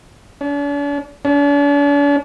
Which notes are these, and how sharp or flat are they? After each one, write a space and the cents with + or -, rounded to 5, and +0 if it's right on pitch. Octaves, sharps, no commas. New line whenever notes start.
D4 -45
D4 -45